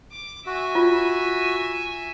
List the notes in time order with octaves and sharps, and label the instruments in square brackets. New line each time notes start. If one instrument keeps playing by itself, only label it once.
[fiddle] D6
[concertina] F#4 [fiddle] E5 G#5
[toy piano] F4